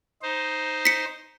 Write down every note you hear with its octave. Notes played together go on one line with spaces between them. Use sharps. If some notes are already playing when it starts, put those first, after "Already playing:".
D#4 C5
B6 C#7